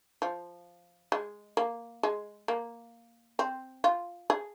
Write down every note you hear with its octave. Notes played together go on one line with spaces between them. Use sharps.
F3
G#3
A#3
G#3
A#3
C4
F4
G#4